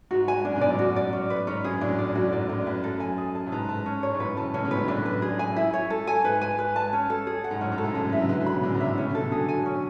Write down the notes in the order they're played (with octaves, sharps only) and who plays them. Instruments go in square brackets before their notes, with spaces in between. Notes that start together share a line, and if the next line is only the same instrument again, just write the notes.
[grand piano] G#2 [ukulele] F#4
[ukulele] G#5
[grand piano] F#2 [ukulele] D4
[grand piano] G#2 B2
[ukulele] D5
[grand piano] F#2 A2
[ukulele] F#4
D5
C#4
B4
[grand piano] G#2 [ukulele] C#4
[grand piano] F#2 [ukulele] G#4
[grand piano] F#2 A2 [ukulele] D4
[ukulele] D5
[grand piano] F#2 [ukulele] F#4
[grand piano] A2
[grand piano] G#2 [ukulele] D5
[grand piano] F#2 [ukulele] D4
[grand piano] F#2 [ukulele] B4
[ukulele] A4
G#5
G#4
A5
[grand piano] A2
[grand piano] G#2 [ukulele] B4
[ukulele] A5
C#4
C#5
[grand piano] G#2
[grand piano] F#2 A2 [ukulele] B4
[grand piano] C#3 E3 [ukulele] A5
[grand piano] A2 C#3 [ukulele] C#4
[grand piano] G#2 B2
[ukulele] B4
[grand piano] F#2
[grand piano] F#2 A2 [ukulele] D4
[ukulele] B4
G#4
G#5
E4
C#5
A4
G#5
[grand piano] G#2 [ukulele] B4
[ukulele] G#5
B4
A5
C#4
A4
G#4
F#5
[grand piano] G#2
[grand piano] F#2 A2 [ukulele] C#4
[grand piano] G#2
[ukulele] A4
[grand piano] F#2 A2
[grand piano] A2 C#3 [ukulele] G#4
[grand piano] C#3 E3
[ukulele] E5
[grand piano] D3 F#3
[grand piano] E3 G#3 [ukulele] B4
[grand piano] D3 F#3
[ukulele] B5
[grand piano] B2 D3
[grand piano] A2 C#3 [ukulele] D4
[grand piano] G#2 B2
[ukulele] E5
[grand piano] A2 C#3
[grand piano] A2 C#3 [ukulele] C#4
[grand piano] B2 D3
[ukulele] A4
[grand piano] B2 D3
[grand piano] D3 F#3 [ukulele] G#4
[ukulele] G#5
C#4